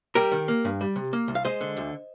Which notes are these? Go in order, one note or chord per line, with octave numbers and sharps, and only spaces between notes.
G3 G4 A#4
D#3
A#3
G2
G3
C3
A#3
C2
F5
G#3 C5 D#5
D3
D2